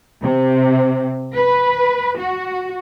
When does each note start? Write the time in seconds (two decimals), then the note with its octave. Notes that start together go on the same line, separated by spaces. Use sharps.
0.22 C3
1.35 B4
2.18 F#4